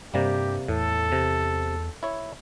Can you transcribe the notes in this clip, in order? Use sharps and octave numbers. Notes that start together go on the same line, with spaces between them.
G2 C3 G3 A#3 G4
E2 A2 A4
C3
E4 C#5